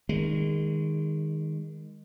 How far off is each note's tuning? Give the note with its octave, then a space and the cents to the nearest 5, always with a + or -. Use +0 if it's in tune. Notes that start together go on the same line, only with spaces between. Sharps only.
D#3 +0 G#3 -25